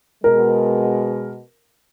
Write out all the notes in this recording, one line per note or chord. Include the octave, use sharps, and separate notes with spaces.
B2 G#3 A#4